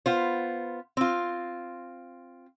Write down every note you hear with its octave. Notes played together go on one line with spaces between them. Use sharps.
B3 F4 C5
C4 F4